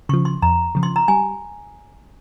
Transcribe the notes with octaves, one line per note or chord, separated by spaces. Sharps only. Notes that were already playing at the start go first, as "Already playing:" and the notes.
C#3 F3 C#6
C6
F2 A#5
C#3 F3
C6
A#5
G3 G#5